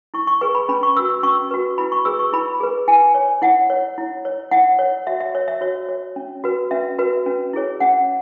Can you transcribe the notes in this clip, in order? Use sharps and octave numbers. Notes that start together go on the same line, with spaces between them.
E4 C#6
C#6
G#4 B4 C#6
B5
C#4 B5
C#6
F#4 B4 E6
E6
C#4 C#6
F#4 B4
E4 B5
C#6
G#4 B4 E6
C#6
E4 B5
G#4 B4
E4 G#5
C#5
E4 F#5
C#5
E4
C#5
E4 F#5
C#5
F#4 E5
E5
C#5
E5
F#4 C#5
C#5
C#4
F#4 B4
C#4 E5
F#4 B4
C#4
E4 G#4 C#5
C#4 F#5